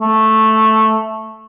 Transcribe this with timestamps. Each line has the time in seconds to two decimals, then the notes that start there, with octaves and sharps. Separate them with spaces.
0.01 A3